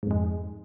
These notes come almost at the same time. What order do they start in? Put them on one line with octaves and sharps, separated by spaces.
G#2 F2 G#3